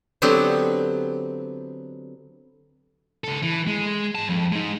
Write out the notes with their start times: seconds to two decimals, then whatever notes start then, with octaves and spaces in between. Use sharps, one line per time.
0.22 D3 F#3 B3 C4 G4
3.24 C#2 A4
3.43 E3
3.67 G#3
4.15 G#2 A5
4.29 F2
4.52 G#3 D#4